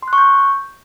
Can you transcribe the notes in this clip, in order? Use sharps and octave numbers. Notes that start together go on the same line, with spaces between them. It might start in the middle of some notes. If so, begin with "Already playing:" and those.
C6
F#6
C#6
G6